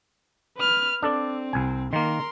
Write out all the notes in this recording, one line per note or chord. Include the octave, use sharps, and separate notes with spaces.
B4 F6
C4 D4 A4 D5
C2 G#5
D#3 A#3 A#4 C6